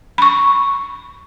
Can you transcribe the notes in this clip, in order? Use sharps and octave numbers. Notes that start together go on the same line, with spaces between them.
B5 C#6